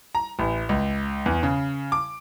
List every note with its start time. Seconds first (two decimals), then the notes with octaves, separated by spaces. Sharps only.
0.15 A#5
0.39 A1
0.69 C#2
1.26 E2
1.43 C#3
1.92 D6